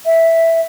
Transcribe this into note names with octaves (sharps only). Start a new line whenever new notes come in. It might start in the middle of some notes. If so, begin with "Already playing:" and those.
E5